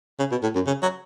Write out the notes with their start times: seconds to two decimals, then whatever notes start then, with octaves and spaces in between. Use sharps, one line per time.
0.19 C#3
0.31 B2
0.43 A2
0.55 F#2
0.67 C#3
0.82 F#3